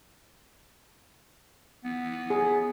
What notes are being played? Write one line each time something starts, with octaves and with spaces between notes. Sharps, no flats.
B3
G#4